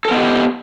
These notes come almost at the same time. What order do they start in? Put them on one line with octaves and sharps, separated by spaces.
A4 A#4 B3 D#5 G4